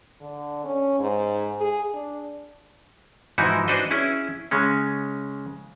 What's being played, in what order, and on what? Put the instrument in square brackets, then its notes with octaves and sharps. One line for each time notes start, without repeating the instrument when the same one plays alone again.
[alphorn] D3
C#4
G#2
G#4
D4
[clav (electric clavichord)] G#2 E3 F3 D#4 E4 F#4
D4 F#4 B4 C5 D#5
C#4 E4 G#4
C#3 G#3 C#4